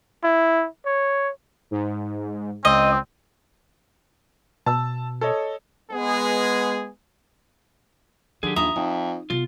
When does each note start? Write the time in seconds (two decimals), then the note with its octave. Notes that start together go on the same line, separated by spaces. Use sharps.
0.24 E4
0.86 C#5
1.71 G#2
2.65 C#2 C4 D#5
4.66 B2 A5 E6
5.21 A4 C#5 D#5
5.92 G#3 B3 G#4
8.43 D3 D#3 F#3 G4 G#4
8.56 A#1 D#2 E5 A#5 D#6
8.76 F2 D#4
9.30 C3 B3 F4